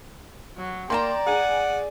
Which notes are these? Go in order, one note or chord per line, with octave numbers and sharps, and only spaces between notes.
F#3
A#3 D5 G5 A5 A#5 C6 E7
G#4 F#5 G#5